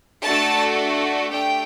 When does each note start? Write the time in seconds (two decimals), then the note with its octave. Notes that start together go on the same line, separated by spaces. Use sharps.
0.23 A3 D4 F#4 A4 A5
1.31 A3 D4 G4 G5